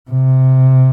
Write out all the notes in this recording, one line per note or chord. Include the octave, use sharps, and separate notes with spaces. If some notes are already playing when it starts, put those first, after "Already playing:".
C3